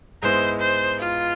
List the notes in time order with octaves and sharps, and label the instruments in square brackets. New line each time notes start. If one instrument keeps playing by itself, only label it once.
[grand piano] G#2 G#3 B3 E4 [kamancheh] C5
[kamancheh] C5
F4